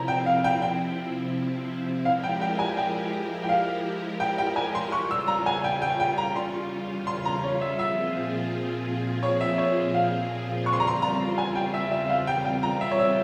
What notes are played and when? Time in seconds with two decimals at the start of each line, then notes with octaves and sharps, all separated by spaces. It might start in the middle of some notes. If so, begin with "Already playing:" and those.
Already playing: C3 F3 C4 E4 A#5
0.08 G5
0.26 F5
0.44 G5
0.62 G5
2.05 F3 G#3 E4 G4 A#4 F5
2.24 G5
2.41 G5
2.59 G#5
2.77 G5
3.43 G5
3.49 F5
4.20 G5
4.38 G5
4.56 G#5
4.75 C6
4.92 E2 C#3 G3 C#4 F4 C#6
5.11 E6
5.28 A#5
5.46 G#5
5.64 G5
5.82 G5
6.00 G5
6.18 A#5
6.36 C6
7.07 C6
7.25 A#5
7.43 C#5
7.61 E5
7.79 A#2 F3 C4 F4 G#4 E5
9.23 C#5
9.41 E5
9.58 C#5
9.94 F5
10.66 E2 C#3 G3 C4 F4 C#6
10.73 C6
10.80 A#5
10.87 C6
11.02 A#5
11.38 G#5
11.55 G5
11.74 E5
11.92 E5
12.10 F5
12.27 G5
12.45 G5
12.63 A#5
12.81 E5
12.91 C#5
12.99 E5